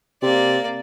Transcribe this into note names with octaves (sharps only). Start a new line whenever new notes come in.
C3 A#3 D5